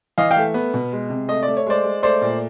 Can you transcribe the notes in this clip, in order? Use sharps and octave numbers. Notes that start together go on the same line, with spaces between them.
E3 D#5 F5
F5 G5
A3
B3
B2
G#3
C3
A3 D#5
A3 D5
C#5
G#3 C5 D5
G#3
A3 C5 D5
A#2